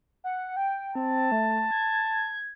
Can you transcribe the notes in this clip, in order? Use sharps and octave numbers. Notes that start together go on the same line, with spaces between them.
F#5
G5
C4 A5
A3
G#6